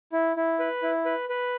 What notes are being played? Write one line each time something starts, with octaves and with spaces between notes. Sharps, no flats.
E4
E4
B4
E4
B4
B4